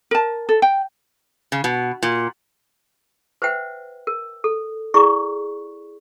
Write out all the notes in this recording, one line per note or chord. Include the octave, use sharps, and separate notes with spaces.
A#4 A5
A4
G5
C#3
B2
A#2
B4 C5 E5 F#5 G5
A#4
A4
E4 G#4 D5 C#6